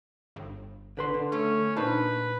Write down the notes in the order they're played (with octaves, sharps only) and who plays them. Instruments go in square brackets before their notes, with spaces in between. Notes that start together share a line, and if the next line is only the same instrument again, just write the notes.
[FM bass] G1
[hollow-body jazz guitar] D3 B4 C6
D3
[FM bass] A3 [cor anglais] C#4
[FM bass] A#2 [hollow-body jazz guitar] D4 D#4 C5 [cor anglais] B4